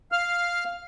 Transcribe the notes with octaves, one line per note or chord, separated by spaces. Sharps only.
F5 F6